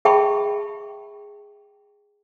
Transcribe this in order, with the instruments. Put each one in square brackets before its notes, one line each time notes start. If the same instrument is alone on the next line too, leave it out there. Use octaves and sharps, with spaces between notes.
[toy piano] G#4 E5 G5 A5 B5 C#6